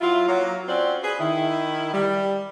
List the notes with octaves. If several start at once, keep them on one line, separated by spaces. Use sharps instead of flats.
F#3 E4 F4
F#3 A#3 C#5
C4 C#4 F4 F#4 C5 D5
G#4 B4
D#3 E4
G3